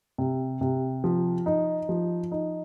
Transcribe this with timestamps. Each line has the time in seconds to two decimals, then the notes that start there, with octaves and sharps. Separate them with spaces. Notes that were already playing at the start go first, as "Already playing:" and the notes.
0.18 C3
0.61 C3
1.04 F3
1.46 D#4
1.89 F3
2.32 D#4